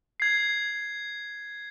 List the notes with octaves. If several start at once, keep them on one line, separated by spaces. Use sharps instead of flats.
G#6 C7